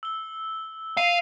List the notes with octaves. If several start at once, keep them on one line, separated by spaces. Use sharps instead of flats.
E6 G7
F5 C7 D#7 F7